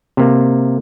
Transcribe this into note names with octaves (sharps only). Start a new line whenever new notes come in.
C3 A#3